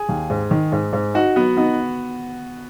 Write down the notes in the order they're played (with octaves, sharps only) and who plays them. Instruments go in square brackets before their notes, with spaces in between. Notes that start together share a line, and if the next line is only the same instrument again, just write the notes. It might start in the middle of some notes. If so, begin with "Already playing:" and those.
Already playing: [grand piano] G#4
[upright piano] D#2
G#2
D#3
G#2
G#2
[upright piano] D#4 [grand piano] F#4
[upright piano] F#3 [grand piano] B3
[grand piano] B3 [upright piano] D#4